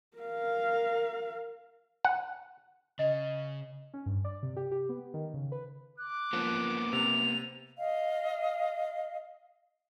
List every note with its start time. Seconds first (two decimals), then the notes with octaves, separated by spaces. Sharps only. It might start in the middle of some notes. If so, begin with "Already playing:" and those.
0.18 A#4 F5
2.05 F#5
2.99 C#3 D#5
3.94 C#4
4.06 G2
4.24 D5
4.43 C3
4.56 G4
4.72 G4
4.89 B3
5.14 D#3
5.34 C#3
5.52 B4
5.98 D6 F#6
6.33 F3 A#3 B3 C#4
6.93 C3 F7
7.78 D#5 F5